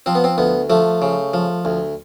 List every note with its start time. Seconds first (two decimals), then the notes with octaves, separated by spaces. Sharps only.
0.06 F3 C4
0.15 B3
0.24 C4
0.38 D2 B3
0.70 F3 A3
1.02 C#3
1.34 F3
1.65 D2